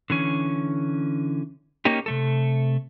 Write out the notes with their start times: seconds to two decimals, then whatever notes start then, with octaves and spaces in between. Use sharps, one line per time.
0.10 D3 E3 C#4
1.85 A#3 C#4 D#4 G4
2.06 C3 A3 A4